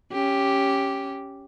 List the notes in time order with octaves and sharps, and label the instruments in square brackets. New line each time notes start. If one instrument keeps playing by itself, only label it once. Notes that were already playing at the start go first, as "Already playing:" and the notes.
[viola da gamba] C#4 G4